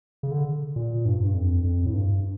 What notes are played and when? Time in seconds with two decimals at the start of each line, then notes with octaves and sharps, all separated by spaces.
0.23 C#3
0.31 D3
0.76 A#2
1.05 G2
1.20 G2
1.35 F2
1.64 F2
1.86 A2
1.94 G2